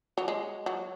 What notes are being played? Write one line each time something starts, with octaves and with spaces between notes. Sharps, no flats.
F#3
G#3
F#3